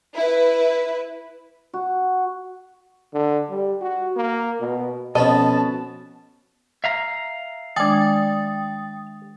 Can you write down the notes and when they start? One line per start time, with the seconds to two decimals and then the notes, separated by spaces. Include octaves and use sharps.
0.16 E4 B4
1.74 F#4
3.13 D3
3.50 G3
3.81 F#4
4.16 A#3
4.60 B2
5.15 F2 B2 B3 C#4 D#5 A5
6.84 E5 F5 A#5
7.76 D#3 G#3 D4 D5 G5 G#5 D#6 A6